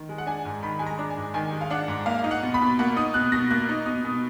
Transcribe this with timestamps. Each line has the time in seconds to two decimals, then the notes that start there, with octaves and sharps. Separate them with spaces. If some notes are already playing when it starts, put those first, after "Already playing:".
Already playing: D#3
0.09 G#3
0.18 F#5
0.26 D4 G#5
0.45 G#2
0.62 D#3 B5
0.79 G#3 G#5
0.86 A#5
0.99 D4
1.10 G#5
1.17 G#2
1.34 D#3 G#5
1.53 G#3
1.61 F5
1.71 D4 F#5
1.88 G#2
2.06 A#3 F5
2.24 D#4
2.31 F#5
2.43 B2
2.54 B5
2.61 B2
2.79 A#3 F#5
2.96 D#4 D#6
3.14 B2 F#6
3.32 B2 A#6
3.50 A#3 F#6
3.69 D#4
3.86 B2 D#6
4.05 B2